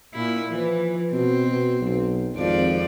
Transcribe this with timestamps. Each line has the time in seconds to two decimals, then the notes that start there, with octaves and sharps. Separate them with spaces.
0.14 A#2 E4
0.50 E3 F3
1.12 B2 C4
1.47 B2
1.80 B1
2.35 G#1 F2 F3 D5